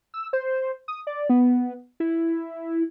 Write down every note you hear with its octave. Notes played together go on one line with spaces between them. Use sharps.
E6
C5
D#6
D5
B3
E4